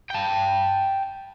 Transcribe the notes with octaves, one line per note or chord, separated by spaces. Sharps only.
G5 A5